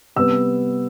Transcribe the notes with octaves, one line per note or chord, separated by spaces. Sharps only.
C3 G3 B3 E6